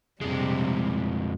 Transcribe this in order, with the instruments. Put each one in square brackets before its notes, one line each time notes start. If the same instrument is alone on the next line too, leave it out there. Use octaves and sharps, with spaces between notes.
[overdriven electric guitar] F2 G#3 [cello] C3 G3